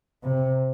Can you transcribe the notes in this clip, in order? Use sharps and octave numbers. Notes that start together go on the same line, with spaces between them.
C3